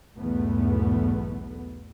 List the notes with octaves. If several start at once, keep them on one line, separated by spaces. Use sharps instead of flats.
B1 E2 G#2 A3 B3